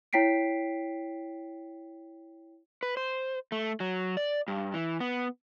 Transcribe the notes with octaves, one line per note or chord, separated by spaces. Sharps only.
E4 C#5 G5 B6 C7 D7
B4
C5
A3
F#3
D5
G2
E3
B3